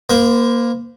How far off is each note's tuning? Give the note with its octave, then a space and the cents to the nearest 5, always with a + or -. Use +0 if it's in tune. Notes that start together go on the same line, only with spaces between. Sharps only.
A#3 +10 C5 -25 B5 +0